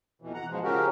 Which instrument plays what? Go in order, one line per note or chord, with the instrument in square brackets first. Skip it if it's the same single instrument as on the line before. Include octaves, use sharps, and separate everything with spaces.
[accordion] F2 B2 E3
F#5 A#5
G#2 B2 F3 G#3
C#3 F3 C#4 F#4 G4 A#4